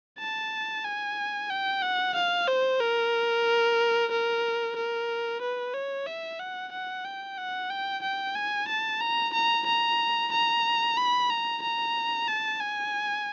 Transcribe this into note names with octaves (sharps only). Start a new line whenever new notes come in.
A5
G#5
G5
F#5
F5
C5
A#4
A#4
A#4
B4
C#5
E5
F#5
F#5
G5
F#5
G5
G5
G#5
A5
A#5
A#5
A#5
A#5
B5
A#5
A#5
A5
G#5